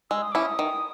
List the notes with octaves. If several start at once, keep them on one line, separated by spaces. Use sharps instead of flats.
G#3 E6
D#6
C#4 E4 D6
D#6
D#3